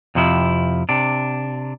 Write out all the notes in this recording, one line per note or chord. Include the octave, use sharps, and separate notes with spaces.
F2 C3 F3 E4
C3 D4